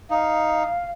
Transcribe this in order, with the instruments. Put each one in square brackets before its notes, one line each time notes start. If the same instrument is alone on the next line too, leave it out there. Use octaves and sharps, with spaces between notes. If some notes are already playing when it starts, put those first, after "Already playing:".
[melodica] D#4 [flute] F5